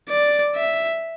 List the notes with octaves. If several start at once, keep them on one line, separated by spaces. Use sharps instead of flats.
D5
E5